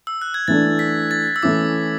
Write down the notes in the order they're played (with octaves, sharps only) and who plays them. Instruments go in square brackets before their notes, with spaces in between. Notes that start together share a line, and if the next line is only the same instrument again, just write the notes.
[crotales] E6
F#6
G#6
[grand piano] E3 A3 D4 [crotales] A6
[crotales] B6
A6
E6
[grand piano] E3 A3 C#4 E4 [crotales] D6